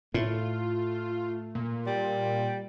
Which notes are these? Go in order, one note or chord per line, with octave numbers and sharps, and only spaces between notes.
A2 A3 F4
A#2
G3